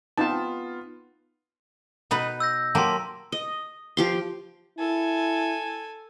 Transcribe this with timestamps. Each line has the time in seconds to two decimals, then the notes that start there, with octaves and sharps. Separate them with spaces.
0.18 B3 C4 D#4 F4 A5
2.11 B2 D#4 B4
2.40 E6 G6 A#6
2.75 F#3 A#3 G4 A5 C6
3.32 D#5
3.97 F3 G4 C6
4.78 E4 A4 G#5